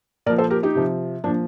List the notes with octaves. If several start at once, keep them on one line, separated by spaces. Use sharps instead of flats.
A#2 F3 A#4 D5
A4 C5
G4 A#4
D#4 G4
C3 F3
A#2 F3 D4